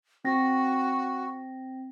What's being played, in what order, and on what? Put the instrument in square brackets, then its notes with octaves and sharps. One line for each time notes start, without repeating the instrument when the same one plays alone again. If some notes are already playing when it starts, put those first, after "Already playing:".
[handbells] C4 A#6 [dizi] F#4